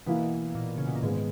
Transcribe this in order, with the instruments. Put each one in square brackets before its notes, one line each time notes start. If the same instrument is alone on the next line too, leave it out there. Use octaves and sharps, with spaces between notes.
[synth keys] B2 [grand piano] E3 A#3 E4
[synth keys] A#2
C#3
B2
A#2
[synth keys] G#2 [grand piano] D#3 G#3 B3